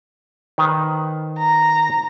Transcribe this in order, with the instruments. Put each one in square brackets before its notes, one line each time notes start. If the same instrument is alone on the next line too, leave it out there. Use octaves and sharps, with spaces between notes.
[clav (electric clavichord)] D#3 B4 C5
[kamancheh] A#5